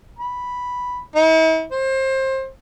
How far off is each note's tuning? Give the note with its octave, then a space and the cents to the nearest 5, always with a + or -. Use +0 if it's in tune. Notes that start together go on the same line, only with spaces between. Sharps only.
B5 -5
E4 -45
C5 +25